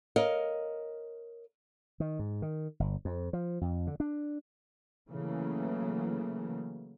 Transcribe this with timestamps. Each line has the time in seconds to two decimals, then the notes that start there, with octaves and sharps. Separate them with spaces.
0.16 A#4 C#5 D#5 F5
2.00 D#3
2.19 G#2
2.42 D#3
2.80 G1
3.05 F2
3.33 F3
3.61 F2
3.87 D3
4.00 D4
5.10 C#3 E3 F#3 A3 A#3